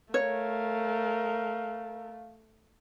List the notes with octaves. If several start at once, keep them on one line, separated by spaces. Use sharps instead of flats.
A3 A#4 C#5 F5